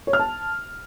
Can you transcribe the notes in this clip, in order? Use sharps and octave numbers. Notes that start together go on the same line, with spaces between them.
C#5
F6
A5